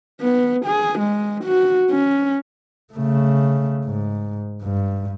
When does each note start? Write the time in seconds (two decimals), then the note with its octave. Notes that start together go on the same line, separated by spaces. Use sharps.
0.22 B3
0.65 G#4
0.99 G#3
1.44 F#4
1.90 C#4
2.94 C#3 A3
3.85 G#2
4.62 G2